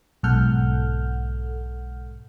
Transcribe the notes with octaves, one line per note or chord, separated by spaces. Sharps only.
B1 G#2 A4 F#5 F6 G6